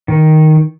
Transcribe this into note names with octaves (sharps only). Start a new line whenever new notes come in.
D#3